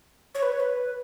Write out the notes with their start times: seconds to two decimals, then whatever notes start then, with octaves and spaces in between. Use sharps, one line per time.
0.35 C#5
0.42 B4
0.52 C#5
0.60 B4